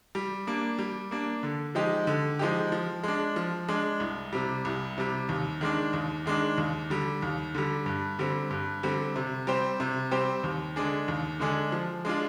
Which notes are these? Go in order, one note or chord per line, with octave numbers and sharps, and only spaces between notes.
G3
A#3 D4
G3
A#3 D4
D3
F3 G#3 D#4 G4
D3
F3 G#3 D#4 G4
F3
G#3 D4
F3
G#3 D4
C2
C3 G3
C2
C3 G3
D#2
D#3 G#3 D4
D#2
D#3 G#3 D4
D#2
D3 G3
D#2
D3 G3
G2
D3 G3 C4
G2
D3 G3 C4
C3
G3 C4 G4 C5
C3
G3 C4 G4 C5
D#2
D3 G#3 D4 G#4
D#2
D3 G#3 D4 G#4
F3
G#3 D4 F4